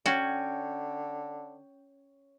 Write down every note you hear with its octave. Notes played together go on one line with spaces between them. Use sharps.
D3 C#4 F#4 C#5 G5